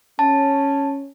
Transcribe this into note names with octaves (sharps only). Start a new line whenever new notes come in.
C#4 A5